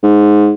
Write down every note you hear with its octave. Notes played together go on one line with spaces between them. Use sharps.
G#2